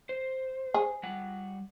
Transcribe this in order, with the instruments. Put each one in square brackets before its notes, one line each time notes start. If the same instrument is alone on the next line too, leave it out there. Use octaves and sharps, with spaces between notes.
[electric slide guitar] C5
[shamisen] G#4
[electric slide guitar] G3 F#5